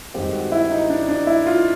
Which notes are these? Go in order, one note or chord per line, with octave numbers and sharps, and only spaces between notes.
G2 D#3 G#3 C4 G4
F#4
E4
D#4
D4
D4
E4
F4